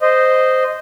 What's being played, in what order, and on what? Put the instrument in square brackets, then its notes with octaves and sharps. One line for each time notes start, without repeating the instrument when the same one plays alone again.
[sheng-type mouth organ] C5 D#5